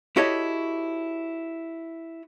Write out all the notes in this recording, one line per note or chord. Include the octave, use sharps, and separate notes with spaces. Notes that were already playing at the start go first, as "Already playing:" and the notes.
E4 F#4 G4 A4 C#5 D#5